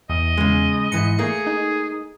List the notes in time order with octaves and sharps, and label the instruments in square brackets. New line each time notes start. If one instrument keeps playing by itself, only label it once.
[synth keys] E2 [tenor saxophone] D#5
[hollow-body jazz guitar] C#3 G#3
[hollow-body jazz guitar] G#2 E3 [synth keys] C#7
[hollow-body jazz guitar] A3 A#3 [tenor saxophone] G#4
[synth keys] D#4